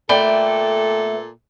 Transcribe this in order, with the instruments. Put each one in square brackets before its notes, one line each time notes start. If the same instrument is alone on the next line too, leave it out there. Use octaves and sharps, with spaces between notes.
[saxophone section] A#2 A4 [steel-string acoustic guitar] A3 B3 [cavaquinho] D5 G5 B5